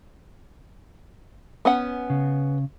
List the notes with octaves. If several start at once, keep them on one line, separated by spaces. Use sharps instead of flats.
B3 C#4 F#5
C#3